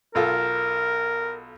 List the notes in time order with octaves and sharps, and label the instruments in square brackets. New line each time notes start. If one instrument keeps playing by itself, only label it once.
[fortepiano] B1 F4 A4 [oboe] A#4